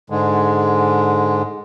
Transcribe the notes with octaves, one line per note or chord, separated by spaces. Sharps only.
G#2 D3 G#3